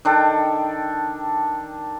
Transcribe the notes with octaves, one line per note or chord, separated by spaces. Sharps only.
D#3 D4 A4 G5